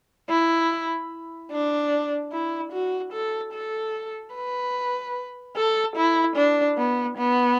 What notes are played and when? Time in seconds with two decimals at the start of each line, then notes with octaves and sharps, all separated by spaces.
0.29 E4
1.52 D4
2.32 E4
2.73 F#4
3.13 A4
3.53 A4
4.35 B4
5.56 A4
5.96 E4
6.36 D4
6.78 B3
7.18 B3